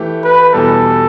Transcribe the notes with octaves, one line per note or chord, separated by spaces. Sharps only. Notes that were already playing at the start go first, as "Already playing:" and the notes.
Already playing: E3 A3 E4 G4
B4
E2 B2 G3 B3 A4